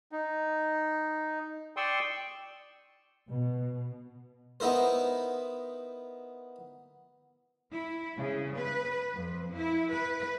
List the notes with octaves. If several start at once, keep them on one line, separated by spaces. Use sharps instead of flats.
D#4
D5 G5 C6 C#6 D#6 E6
B2
B3 D#4 E4 A#4 C5
E4
C#3
B4
F2
E4
B4